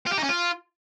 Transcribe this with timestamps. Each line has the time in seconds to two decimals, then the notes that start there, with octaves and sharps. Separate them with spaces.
0.07 F4
0.12 G4
0.18 D#4
0.24 C#4
0.29 F4